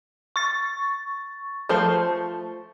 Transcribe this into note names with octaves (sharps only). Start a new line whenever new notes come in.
C#6 A6
F3 A3 C5